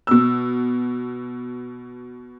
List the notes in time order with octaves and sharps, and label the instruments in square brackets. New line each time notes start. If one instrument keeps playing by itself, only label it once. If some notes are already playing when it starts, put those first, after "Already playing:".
[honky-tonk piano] B2 E6